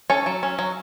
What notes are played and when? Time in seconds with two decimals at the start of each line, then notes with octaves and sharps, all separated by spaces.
0.10 C#4 A4 C#5
0.26 F#3
0.43 C#4
0.59 F#3